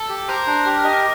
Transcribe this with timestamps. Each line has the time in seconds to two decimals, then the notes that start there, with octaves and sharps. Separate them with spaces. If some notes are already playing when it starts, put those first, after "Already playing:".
Already playing: A4
0.09 G4
0.29 A#4 C5
0.47 D4
0.66 G4
0.84 D#5